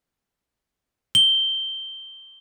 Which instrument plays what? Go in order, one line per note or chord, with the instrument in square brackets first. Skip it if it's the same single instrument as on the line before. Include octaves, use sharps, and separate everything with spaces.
[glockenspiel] G7